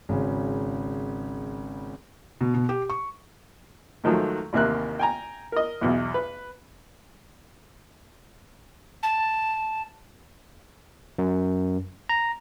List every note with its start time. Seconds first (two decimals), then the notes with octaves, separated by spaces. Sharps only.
0.09 G#1 C#3
2.41 B2
2.54 B2
2.69 G4
2.90 C#6
4.04 G#2 D#3 F3 F#3 A3
4.53 A1 D#2 C3 A#3 F#6
4.99 G5 G#5 A#5
5.52 A#4 D#5
5.81 B1 E2 B2
6.14 B4
9.03 A5
11.18 F#2
12.09 A#5